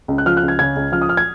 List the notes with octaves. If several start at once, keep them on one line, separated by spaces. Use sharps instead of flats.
C#2
F#6
F3 F6
F#6
C#2
G#6
C#3 G#6
C#2
F3 F6
D#6
F6
G#6